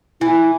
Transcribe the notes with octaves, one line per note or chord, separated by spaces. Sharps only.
E3 E4